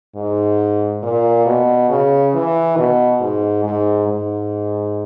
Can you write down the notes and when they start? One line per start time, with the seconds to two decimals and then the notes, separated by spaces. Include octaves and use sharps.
0.16 G#2
1.03 A#2
1.46 B2
1.90 C#3
2.34 E3
2.77 B2
3.21 G#2
3.64 G#2
4.07 G#2